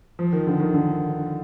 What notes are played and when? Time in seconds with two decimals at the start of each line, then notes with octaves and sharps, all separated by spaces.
0.19 F3
0.33 D#3
0.47 D3
0.60 D#3
0.74 D3